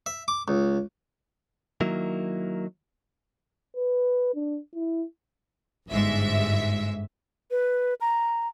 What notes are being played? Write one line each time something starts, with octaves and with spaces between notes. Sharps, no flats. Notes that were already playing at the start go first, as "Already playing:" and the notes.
E5
D6
C#2
D#3 F#3 A#3 E4
B4
D4
E4
G1 G#2 E5
B4
A#5